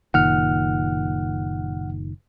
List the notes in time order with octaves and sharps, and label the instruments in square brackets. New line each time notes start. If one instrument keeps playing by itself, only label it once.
[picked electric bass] F#1 A#2 D#3 [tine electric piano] F#5 F6